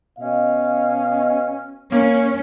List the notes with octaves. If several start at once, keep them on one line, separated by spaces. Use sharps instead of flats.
B2 C#4 D#5 F5
A#3 C#4